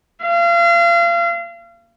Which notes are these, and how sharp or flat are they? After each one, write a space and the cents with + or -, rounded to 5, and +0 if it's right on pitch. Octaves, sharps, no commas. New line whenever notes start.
F5 -35